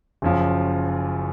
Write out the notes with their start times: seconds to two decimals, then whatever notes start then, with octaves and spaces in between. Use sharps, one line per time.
0.22 F#1 F#2 F3